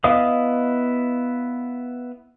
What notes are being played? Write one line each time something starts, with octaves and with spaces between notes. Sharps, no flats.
B3 E4 D#5 F5 D#6